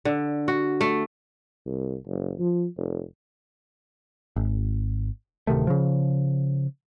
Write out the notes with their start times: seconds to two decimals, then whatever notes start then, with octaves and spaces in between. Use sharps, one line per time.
0.05 D3
0.48 F#4
0.81 A3
1.66 C2
2.07 F#1
2.38 F3
2.77 F1
4.36 G#1
5.47 D1 C3 D#3 A3
5.67 C#3 F3